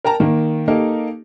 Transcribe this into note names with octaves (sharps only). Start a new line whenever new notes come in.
A#4 G5 A5 A#5
D#3 A#3
A#3 D#4 G4 A4 A#4